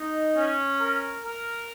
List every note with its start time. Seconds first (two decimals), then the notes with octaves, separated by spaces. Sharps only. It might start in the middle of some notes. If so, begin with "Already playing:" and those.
Already playing: D#4
0.36 C#4
0.80 A#4
1.24 A#4